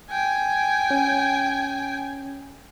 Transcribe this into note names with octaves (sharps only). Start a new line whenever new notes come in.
G5 G#5
C#4